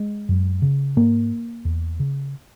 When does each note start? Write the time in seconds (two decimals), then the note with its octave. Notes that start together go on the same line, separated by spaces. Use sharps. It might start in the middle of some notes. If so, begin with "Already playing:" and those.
Already playing: G#3
0.29 F#2
0.62 C#3
0.97 G#2 A#3
1.65 E2
2.00 C#3